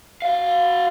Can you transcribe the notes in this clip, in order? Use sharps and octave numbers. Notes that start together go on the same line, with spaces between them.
F#4 F5